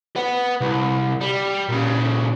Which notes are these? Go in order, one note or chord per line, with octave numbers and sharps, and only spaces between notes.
B4 F#5
C2
G3
A#2 C#3